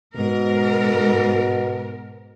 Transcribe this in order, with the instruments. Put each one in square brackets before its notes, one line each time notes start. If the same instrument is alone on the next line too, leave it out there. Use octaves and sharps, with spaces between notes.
[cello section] G#2 A#4 [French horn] B2